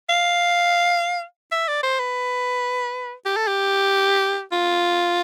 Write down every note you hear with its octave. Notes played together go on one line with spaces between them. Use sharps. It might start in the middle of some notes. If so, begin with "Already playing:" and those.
F5
E5
D5
C5
B4
G4
A4
G4
F4